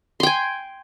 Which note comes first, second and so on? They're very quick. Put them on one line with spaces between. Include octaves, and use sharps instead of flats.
C6 G5 G#5